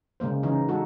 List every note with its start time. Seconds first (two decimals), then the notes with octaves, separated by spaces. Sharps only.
0.20 C#3 G#3 A#3 C5
0.43 C#3 E3 C#4 D#4
0.68 G#3 D#4 F#4 A4